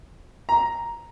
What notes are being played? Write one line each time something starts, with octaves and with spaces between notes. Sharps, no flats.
A#5